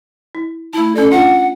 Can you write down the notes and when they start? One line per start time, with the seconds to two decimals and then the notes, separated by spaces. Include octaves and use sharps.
0.35 E4
0.73 A3 E4 A5
0.95 C#4 A4 D5
1.11 D4 F4 F5 F#5